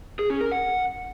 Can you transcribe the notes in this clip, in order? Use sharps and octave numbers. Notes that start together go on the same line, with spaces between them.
G#4
C#4
A#4
F#5